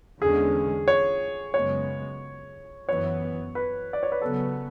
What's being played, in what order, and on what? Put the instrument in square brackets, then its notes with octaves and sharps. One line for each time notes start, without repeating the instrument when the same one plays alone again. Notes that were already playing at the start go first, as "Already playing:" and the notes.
[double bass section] E2 D3 G#3 C#4 [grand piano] G#4
[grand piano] C#5
[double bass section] F#2 C#3 G#3 B3 [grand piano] C#5
[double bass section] F#2 E3 B3 [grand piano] C#5
[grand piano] B4
D5
C#5
B4
[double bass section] C#3 F#3 B3 [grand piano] A4